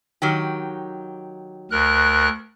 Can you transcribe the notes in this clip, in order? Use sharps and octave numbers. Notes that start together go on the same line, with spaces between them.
D#3 F#3 G4
D2 A#4 F#6